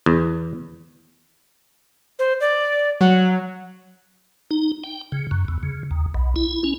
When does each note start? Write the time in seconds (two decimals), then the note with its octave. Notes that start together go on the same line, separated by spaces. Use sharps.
0.06 E2
2.19 C5
2.40 D5
3.01 F#3 F#5
4.51 D#4
4.84 G5
5.12 C#3
5.31 F#2
5.48 E2
5.63 C#3
5.91 D#2
6.14 B1
6.36 E4
6.64 C#4